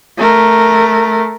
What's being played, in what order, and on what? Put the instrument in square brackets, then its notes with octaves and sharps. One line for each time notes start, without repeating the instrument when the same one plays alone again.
[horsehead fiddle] A3 A#4